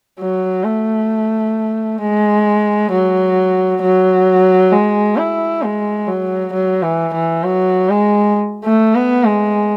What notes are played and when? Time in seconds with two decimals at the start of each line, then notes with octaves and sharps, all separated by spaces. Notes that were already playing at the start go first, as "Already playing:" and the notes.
0.20 F#3
0.64 A3
2.01 G#3
2.91 F#3
3.82 F#3
4.72 G#3
5.17 E4
5.62 G#3
6.07 F#3
6.53 F#3
6.83 E3
7.14 E3
7.44 F#3
7.89 G#3
8.64 A3
8.95 B3
9.24 G#3